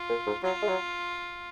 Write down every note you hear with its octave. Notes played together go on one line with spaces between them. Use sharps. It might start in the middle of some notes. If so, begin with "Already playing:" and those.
Already playing: F4
A#2
G#2
F#3 F4
G#3
F#3